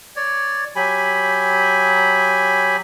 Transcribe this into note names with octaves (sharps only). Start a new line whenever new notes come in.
C#5 D5
F#3 G4 G#5 B5